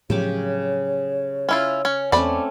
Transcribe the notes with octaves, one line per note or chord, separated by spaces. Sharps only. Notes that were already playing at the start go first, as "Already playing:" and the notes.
A2 C#3 F3 F#3 G4 C#5 D6
C#4 E4 F4
C#4
E2 A3 C4 C#4 D5 B5